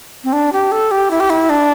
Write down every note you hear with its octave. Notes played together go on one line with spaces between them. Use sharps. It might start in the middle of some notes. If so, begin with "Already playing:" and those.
C4
D4
G4
A4
G4
E4
G4
E4
D4